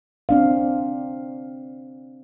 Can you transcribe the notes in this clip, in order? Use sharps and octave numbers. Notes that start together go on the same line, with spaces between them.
C4 D4 F5